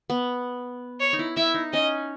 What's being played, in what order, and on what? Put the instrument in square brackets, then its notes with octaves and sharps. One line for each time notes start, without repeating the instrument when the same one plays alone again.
[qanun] B3
[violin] C#5
[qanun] D#4
E4
[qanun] E4 [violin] E5
[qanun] D#4
[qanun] C#4 [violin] D#5